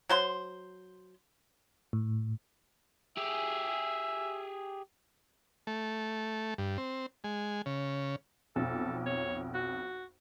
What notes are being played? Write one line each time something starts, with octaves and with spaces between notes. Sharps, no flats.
F#3 C5 C6
A2
G4 G#4 E5
A3
G2
C4
G#3
C#3
B1 F2 A4
C#5
F#4